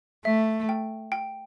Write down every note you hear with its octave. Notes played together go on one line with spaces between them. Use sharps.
A3 E5
G5
G5